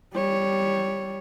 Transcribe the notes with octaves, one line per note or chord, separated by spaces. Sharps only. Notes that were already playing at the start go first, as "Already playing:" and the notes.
G3 C#5